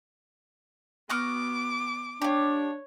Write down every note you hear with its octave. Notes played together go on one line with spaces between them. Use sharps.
B3 F#4 D6 D#6 F6
D4 G4 C#5 F5